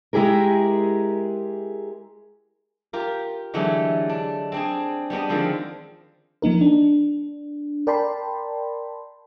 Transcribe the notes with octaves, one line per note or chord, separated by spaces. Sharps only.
G#3 E4 G4 G#4 A#4
F4 G4 A#4
D3 E3 F#3 G#3 A3 G4
D4
C4 D4 G#4
G3 B3 D4 D#5
D3 D#3 F3 G#3 C4
F3 A#3 D#4 A#4
D4
A#4 D5 G5 A5 B5 C6